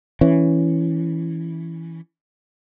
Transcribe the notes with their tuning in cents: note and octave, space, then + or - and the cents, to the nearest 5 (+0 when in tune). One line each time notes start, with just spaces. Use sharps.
E3 +0 C#4 +0